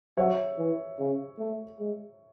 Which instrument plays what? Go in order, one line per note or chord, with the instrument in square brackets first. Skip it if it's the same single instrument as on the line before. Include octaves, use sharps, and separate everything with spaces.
[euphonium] F#3 [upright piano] C#5 E5
[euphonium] E3
C#3
A3
G#3